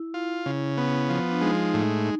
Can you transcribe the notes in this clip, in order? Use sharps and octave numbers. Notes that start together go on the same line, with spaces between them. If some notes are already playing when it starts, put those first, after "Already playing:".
Already playing: E4
F4
C#3
B3
F3
D4
G#3 D#4
A2